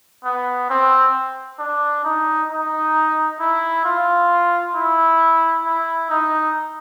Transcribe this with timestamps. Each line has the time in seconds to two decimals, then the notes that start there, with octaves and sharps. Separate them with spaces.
0.24 B3
0.70 C4
1.59 D4
2.05 D#4
2.50 D#4
3.40 E4
3.85 F4
4.75 E4
5.65 E4
6.10 D#4